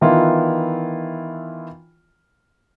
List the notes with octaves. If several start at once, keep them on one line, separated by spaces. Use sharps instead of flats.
D#3 E3 B3 E4 F4